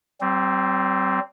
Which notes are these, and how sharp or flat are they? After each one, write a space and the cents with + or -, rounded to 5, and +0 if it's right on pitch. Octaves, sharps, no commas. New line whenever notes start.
G3 -40 C4 +0